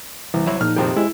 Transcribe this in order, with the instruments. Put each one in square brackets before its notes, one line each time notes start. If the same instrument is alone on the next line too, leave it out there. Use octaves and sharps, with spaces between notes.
[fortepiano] C2 [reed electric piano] E3
[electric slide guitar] F#3 C5 C#5 [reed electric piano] E4
[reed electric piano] A#2 F3 [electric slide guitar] D#4 [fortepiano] F6
[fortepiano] F2 C3 D#3 [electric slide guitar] G4 C5
[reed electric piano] G#3 [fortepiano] E4